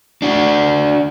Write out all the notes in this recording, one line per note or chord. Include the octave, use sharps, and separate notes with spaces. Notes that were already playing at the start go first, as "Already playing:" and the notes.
D4 F#4